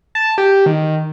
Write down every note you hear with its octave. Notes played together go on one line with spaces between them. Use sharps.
A5
G4
D#3